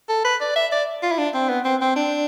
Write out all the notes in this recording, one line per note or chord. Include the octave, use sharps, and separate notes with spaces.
A4
B4
D5
E5
D5
F4
E4
D4
C4
B3
C4
C4
D4